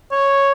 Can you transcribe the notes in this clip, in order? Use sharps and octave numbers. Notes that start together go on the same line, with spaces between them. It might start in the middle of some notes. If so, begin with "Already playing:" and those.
C#5